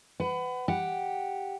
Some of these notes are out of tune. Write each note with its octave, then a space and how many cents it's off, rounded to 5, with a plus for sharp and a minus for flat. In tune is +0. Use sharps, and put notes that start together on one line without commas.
B4 +30 F#5 +20
G4 +0 F#5 +0